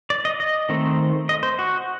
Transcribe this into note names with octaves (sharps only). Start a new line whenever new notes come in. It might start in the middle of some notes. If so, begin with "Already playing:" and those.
D5
D#5
D#5
D#3 A3 C4
D#5
C5
F#4